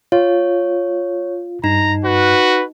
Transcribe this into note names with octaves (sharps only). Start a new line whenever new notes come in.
F4 C#5
G2 D#4 A#5
F#4 B4